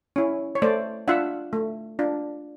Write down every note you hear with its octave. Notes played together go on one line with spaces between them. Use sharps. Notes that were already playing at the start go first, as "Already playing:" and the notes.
C#4 E4
C#5
A3 C5 D5
D4 F4 E5 F#5
A3
D4 F4